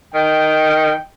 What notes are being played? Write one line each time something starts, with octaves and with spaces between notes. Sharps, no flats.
D#3 G5